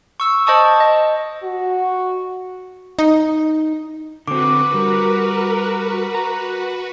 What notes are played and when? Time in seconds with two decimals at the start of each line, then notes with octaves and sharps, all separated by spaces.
0.20 C#6 E6
0.47 C5 D#5 A5 C#6 D#6
0.80 D#5
1.44 F#4
2.99 D#4
4.28 D3 C4 F#4 B4 D6
4.74 G3 A#4
6.15 A#5